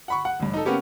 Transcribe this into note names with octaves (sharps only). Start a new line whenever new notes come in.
F#5 B5 C#6
F#5
A1 G2
D#4 A4
A#3 B3 C#4 G4